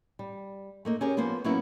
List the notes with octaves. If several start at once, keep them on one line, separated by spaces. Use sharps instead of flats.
G3
A3 A#3 D#4
C#4 G4 G#4 A#4 C#5
F3 A#3 B3 C5
F#3 A#3 B3 C#4 E4 F#4